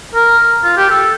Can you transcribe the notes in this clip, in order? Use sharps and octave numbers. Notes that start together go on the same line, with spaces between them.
A#4
F4
G4
A4